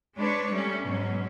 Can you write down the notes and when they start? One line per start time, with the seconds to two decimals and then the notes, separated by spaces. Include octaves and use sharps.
0.17 G#3 D4 B4 C#5
0.52 G3 A3 C#4
0.87 G#2 B2 F#3 C#4